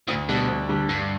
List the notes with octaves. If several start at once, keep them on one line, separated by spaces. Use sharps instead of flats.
D2 A2
B2 D3 G3 D4
D2
D3 G3 D4
G2 D3